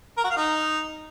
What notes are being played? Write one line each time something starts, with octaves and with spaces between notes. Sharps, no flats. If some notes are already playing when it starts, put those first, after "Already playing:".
A#4
F#4
F5
D#4